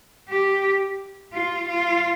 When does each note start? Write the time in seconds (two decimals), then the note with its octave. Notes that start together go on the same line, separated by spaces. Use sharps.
0.29 G4
1.34 F4
1.69 F4